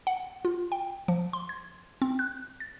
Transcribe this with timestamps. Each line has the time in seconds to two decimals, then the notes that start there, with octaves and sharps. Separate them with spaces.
0.07 F#5
0.45 F4
0.72 G5
1.08 F3
1.33 C6
1.49 G#6
2.02 C4
2.19 F#6
2.60 A6